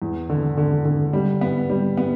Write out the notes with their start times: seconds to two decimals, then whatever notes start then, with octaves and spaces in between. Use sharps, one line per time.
0.02 E2
0.29 D3
0.57 D3
0.85 D3
1.13 G3
1.41 B3
1.70 G3
1.97 B3